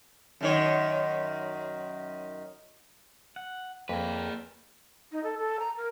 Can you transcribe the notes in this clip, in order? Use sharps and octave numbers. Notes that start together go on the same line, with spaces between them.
F#2 D#3 C#5
F#5
F2 A#3 G#4 B4
D#4
A4
A4
A#5
A#4